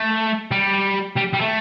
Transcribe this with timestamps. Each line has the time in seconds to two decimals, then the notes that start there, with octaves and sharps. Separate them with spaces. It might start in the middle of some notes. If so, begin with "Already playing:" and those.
Already playing: A3
0.51 G3
1.16 G3
1.33 G3
1.41 A3